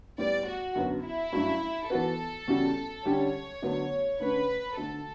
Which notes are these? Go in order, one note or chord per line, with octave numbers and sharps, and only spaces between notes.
A2 G3 B3 D5
F#4
F#2 D3 F#3 B3
E4
G2 F#3 A3 C#4
E3 B3 F#4 A4 B4
E2 C#3 G3 C#4 F#4
D3 G3 C#4 G4 C#5
D2 D3 F#3 B3
D3 A3 C#4 B4
D2 D3 A3 A4